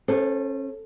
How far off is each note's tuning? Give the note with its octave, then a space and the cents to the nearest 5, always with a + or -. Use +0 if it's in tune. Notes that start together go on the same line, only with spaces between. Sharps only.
C#4 -30 A4 +0 C5 +0